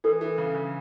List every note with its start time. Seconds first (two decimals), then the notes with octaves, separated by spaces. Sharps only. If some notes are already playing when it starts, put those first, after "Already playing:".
0.04 E3 A4
0.21 E3
0.38 C#3
0.55 C#3